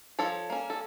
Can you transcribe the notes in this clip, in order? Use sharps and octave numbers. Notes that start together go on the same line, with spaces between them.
F3 A4 C#5
A#3 C#4
A4